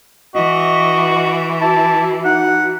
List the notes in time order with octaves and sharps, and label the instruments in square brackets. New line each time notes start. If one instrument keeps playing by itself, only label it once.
[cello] E3 [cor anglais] F#4 [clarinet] D#5
[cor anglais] E4 [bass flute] F#4 [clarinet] A5
[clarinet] D#4 [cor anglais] F#5